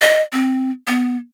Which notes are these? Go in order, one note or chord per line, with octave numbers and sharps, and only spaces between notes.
D#5
C4
B3